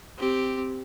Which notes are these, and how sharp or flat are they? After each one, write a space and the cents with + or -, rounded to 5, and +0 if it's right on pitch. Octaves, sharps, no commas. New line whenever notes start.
C4 -5 G4 +0